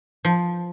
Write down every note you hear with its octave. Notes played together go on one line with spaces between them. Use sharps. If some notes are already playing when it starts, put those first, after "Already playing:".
F3